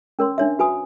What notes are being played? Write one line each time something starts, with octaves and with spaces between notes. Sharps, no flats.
C#4 A#4 C#5 C6
D4 C#5 E5
F#4 B4 G#5 D#6